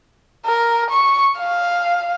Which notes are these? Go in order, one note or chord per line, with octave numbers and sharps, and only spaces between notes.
A#4
C#6
F5